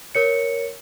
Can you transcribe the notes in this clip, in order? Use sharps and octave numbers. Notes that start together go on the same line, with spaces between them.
A#4 C#5 C#7